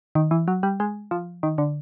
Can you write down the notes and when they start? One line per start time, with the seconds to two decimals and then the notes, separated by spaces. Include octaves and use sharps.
0.15 D#3
0.31 E3
0.48 F#3
0.63 G3
0.80 G#3
1.11 F3
1.43 D#3
1.58 D3